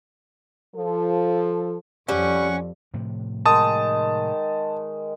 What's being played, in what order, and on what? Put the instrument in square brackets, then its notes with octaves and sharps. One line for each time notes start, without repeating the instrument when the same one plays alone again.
[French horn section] F3 A4
[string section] F2 [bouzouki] G3 [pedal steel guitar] C#4 [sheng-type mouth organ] F#5 C#6
[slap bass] A2 C3 F3
[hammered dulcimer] D#3 G#3 [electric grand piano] A5 D#6